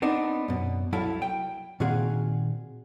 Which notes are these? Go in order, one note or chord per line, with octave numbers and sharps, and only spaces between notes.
B3 C4 D4 D#4
F#2 B2
C2 F#3 E4 A4 F5 A5
G5
A#2 D#3 C4 F#4 G#4 F5